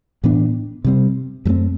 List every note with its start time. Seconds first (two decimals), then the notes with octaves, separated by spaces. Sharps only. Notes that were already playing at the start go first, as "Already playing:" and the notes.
0.24 A2 E3 B3 D4
0.84 C3 G3 C4
1.45 F#2 F#3 A3 C4